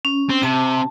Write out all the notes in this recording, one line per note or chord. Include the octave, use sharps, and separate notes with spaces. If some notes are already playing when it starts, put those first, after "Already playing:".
C#4
C4
C3 A5